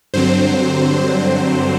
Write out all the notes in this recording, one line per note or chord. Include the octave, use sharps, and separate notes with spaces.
G2 D3 F#3 C4 C5